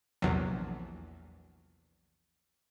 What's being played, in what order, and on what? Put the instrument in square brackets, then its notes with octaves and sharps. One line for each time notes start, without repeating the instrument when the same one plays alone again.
[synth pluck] A#1 E2 C3 F#3